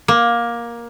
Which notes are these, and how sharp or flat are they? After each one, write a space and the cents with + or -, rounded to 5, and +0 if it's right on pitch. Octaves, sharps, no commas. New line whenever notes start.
A#3 +15